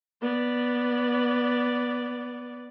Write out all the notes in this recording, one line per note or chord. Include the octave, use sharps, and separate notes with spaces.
B3 D5